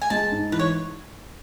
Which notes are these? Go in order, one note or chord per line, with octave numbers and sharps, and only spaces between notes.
G#5
G#3 A5
G#2
E3 B4
C#5